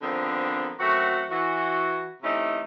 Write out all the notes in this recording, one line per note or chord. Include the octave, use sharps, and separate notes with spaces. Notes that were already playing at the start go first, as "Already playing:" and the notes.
D3 D#3 F3 B3 C4
F#2 A3 C4 F#4
E3 F#4
C3 E3 A3 C#4 D#4 E4